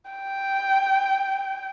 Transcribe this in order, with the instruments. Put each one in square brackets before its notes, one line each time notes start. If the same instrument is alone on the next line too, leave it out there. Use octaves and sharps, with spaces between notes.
[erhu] G5